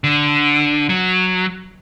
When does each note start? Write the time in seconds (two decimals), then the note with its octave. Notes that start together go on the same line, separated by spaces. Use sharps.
0.04 D3
0.89 F#3